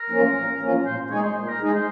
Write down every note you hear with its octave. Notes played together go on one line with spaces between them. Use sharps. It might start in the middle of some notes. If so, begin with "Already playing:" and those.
Already playing: A#4
F3 A#3 C#4 F4
A#2
F3 A#3 C#4 F4
A#2 C5
G#3 D#4 G#4 C#5
C5
A#2 C5
A#4
G#3 D#4 G#4
C5